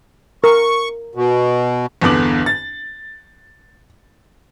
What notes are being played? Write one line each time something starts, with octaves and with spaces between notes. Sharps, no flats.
A#4 C#6
B2
G1 E2 D3 B3 D6 F#7
A6